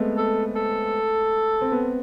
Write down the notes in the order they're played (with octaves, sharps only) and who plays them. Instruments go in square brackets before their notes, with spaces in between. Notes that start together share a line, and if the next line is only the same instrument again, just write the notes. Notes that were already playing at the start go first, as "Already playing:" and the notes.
Already playing: [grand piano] G#3 A3 B3 C4
[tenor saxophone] A4
A4
[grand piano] C4
B3